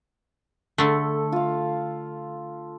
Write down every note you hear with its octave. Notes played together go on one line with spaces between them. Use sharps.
D3 A3 A4
F4 F5